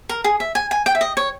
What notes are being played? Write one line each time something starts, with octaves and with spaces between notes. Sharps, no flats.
A#4
G#4
E5
G#5
G#5
G5
E5
D#5
C#5